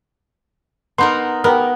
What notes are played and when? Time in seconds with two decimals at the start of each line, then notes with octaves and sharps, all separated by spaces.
0.98 B3 D#4 A#4 C6
1.44 B3 G4 A#4